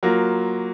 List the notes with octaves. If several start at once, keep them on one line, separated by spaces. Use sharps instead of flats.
F#3 A#3 F4